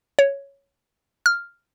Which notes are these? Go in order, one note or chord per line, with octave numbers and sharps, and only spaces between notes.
C#5
F6